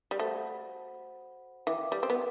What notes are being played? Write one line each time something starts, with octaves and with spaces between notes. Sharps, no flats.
G3
A3 F#4 C5 F#5 B5
E3 B4 E5 G5 D6
G3
C4
B3